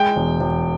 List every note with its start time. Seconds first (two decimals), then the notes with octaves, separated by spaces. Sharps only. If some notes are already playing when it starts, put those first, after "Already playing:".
Already playing: G#3 G5
0.16 E1
0.40 E1